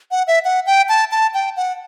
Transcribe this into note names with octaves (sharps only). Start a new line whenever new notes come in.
F#5
E5
F#5
G5
A5
A5
G5
F#5